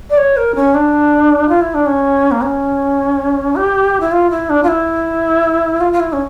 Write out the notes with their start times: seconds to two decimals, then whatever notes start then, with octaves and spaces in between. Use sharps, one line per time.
0.10 D5
0.17 C#5
0.37 A#4
0.55 C#4
0.74 D4
1.49 F4
1.61 E4
1.74 D4
1.86 C#4
2.31 A#3
2.43 C#4
3.56 G4
4.00 E4
4.12 F4
4.30 E4
4.49 D4
4.63 F4
4.68 E4
5.80 F4
5.93 F4
6.00 E4
6.13 C#4